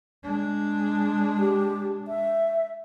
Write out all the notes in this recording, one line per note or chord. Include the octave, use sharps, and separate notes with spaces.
G#3 D4
G4
E5